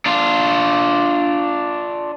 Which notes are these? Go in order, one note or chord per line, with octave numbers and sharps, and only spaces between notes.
D4 F4